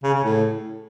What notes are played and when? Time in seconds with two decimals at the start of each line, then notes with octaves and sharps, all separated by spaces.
0.03 C#3
0.14 C#3
0.24 A2